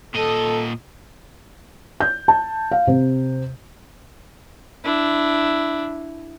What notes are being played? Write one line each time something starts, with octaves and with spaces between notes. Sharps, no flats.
A#2 A4 D#5
G6
A5
F5
C3
D4 E4